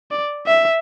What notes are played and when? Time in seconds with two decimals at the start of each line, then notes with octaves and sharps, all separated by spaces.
0.11 D5
0.47 E5